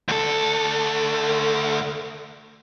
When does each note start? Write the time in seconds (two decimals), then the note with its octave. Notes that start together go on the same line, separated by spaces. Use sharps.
0.09 D2 A4